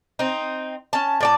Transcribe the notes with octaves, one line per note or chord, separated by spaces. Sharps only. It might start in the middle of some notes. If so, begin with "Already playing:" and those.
C4 D#4
C#4 A5
A2 D5 A5